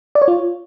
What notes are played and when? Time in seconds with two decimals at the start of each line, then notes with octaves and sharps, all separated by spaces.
0.15 D5
0.22 C#5
0.28 F4